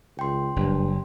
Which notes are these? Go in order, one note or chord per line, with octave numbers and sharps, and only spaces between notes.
C#2 G5 C6
F#1 G2